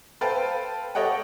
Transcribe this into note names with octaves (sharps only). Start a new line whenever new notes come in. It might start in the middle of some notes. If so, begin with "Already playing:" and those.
A4 B4 C5 F5 G5 A5
G4 A4 C#5 D#5 F#5 G5